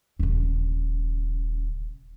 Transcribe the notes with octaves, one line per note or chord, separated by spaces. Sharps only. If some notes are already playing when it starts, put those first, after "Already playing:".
D#1 C#3